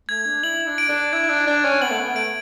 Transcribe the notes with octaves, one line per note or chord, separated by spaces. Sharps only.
A3 G#6
D4
E4 F#7
D4
D7
D4
E4 G#6
D4
D4 G#6
C#4
B3 F#7
A3
B3
A3 D7